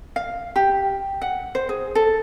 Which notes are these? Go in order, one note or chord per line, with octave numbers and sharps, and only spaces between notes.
F5
G4
F#5
C5
G#4
A4